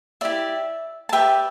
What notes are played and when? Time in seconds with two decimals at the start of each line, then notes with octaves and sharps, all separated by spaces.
0.21 E4 G4 D5 E5
1.09 A5
1.13 G4 B4 D5 E5 G5